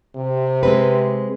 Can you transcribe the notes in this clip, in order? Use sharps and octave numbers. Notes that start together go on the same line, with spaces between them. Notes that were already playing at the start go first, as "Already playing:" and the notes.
C3
G#3 C4 B4